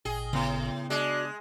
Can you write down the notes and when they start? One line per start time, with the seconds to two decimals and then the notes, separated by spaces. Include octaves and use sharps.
0.05 G#1 A#2 G#4 G5
0.33 A2 C#3 B3
0.90 G#3 D4 F#4